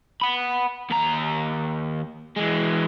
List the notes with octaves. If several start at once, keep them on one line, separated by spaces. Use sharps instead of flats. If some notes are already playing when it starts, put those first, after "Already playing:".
F#5 B5
D#2 A#5
E3 G#3